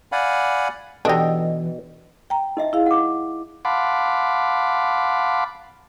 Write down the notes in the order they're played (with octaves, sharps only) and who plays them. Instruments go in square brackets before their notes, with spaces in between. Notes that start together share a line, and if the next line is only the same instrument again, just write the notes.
[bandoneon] D5 F5 F#5 G#5 B5
[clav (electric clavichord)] B2 D#4 [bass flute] E3 [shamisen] D4 G4 [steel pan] A4 D#5
[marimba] G5 A#5
[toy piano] D#4 D#5 E5
[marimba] E4 G#4 F5
[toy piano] F#5 D6
[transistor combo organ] F5 F#5 A5 B5 C6 D6